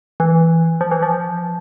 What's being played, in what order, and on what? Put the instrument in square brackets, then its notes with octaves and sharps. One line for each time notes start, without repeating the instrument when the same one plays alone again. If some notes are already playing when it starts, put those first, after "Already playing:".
[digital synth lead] E3
F3
E3
F3